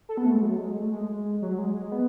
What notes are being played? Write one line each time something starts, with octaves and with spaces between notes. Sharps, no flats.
A4
B3
A3
G#3
F#3
G#3
A3
G#3
F#3
G#3
G#3
B3